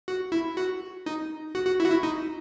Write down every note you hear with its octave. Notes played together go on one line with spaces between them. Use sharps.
F#4
E4
F#4
D#4
F#4
F#4
E4
F#4
E4
D#4